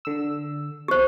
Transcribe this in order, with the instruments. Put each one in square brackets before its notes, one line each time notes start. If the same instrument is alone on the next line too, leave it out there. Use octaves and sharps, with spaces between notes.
[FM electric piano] D3 E6
[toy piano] G4 C5